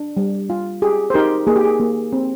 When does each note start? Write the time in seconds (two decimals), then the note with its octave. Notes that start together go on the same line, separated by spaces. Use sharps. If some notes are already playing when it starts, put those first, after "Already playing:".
Already playing: D4
0.17 G3
0.50 F4
0.82 G4 G#4
1.10 C5
1.14 D#4 G4 A#4
1.47 A#3 G#4
1.56 G4
1.64 G#4
1.80 A#3
2.13 C4